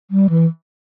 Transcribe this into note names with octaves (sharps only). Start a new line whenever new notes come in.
G3
E3